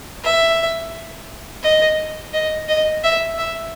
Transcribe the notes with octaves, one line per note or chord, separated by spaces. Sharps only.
E5
D#5
D#5
D#5
E5
E5